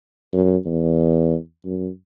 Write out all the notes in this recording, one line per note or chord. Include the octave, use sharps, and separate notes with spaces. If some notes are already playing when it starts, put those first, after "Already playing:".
F#2
E2
F#2